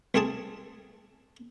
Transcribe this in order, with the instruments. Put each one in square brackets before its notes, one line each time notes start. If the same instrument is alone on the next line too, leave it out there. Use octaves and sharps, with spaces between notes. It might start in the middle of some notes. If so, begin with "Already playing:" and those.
[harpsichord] C2 A3 C4 G#4 A5